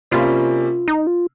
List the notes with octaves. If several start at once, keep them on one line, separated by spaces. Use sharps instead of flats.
C3 G3 A#3 C#4 F4
D#4
F4